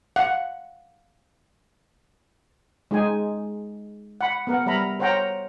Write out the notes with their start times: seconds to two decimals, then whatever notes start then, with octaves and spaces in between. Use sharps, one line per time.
0.16 F5 F#5
2.91 G#3 D#4 G#4 G5 G#5
4.21 F#5 B5
4.47 B3 A#4 F#5
4.66 G3 A#4 E5 A#5 B5
5.00 A#4 C5 C#5 F#5 G5 A#5